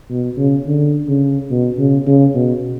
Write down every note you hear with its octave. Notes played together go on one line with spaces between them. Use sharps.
B2
C#3
D3
C#3
B2
C#3
C#3
B2